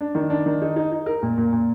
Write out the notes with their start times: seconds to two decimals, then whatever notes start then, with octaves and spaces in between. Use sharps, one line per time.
0.01 D4
0.15 D#3
0.30 D4
0.46 D#3
0.62 D#4
0.76 D#4
0.92 D#4
1.06 A#4
1.23 A#2
1.38 A#2
1.53 A#2